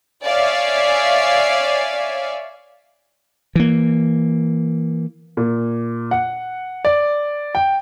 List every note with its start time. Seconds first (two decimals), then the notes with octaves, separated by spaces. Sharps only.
0.25 C#5 D5 E5 F5 G#5
3.56 E3 A#3
5.37 A#2
6.11 F#5
6.85 D5
7.55 G5